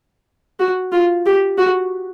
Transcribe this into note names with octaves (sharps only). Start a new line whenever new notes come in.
F#4
F4
G4
F#4